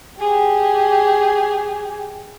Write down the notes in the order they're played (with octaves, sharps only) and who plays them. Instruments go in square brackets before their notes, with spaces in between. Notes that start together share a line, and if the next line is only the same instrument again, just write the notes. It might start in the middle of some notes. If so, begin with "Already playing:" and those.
[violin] G4 G#4